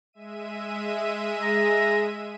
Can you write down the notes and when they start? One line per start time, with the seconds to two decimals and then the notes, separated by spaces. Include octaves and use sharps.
0.13 G#3 E5 D#7
1.42 G#4 A#5